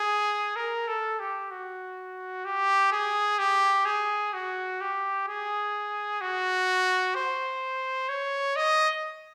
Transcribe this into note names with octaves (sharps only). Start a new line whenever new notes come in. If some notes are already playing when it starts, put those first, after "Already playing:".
Already playing: G#4
A#4
A4
G4
F#4
G4
G#4
G4
G#4
F#4
G4
G#4
F#4
C5
C#5
D#5